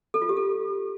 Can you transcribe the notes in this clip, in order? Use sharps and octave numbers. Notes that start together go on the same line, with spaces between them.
A4
F4
G4
A4